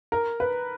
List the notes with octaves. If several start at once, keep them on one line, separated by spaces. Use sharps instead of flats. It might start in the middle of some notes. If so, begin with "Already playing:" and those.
A#4
B4